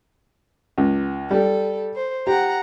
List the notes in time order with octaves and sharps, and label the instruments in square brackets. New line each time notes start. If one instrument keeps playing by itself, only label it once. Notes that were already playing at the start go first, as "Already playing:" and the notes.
[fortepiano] C#2
[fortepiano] G3 G4 [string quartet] A4
[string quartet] C5
[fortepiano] G4 [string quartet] F#5 A#5